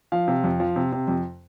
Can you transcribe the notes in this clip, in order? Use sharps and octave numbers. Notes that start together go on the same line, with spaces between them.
F3 F5
C3
F2
F3
C3
C3
F2